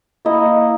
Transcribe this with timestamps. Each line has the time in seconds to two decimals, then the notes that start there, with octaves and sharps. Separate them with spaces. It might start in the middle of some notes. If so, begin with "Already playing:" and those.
0.25 A#3 E4 D#5